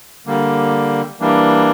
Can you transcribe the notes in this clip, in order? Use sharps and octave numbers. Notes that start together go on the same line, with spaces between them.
D3 G3 A#3
E3 G3 A#3 D4